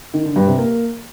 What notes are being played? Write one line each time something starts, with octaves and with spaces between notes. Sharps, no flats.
D#3
D3
G2
C3
A#3